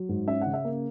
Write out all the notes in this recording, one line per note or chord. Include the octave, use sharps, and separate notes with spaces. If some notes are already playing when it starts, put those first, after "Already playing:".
Already playing: F#3
G#2
C#4 E5
C#3 F#5
E5
A#3